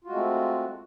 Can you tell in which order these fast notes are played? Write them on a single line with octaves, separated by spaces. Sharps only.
F4 F#4 G#3 A3 C4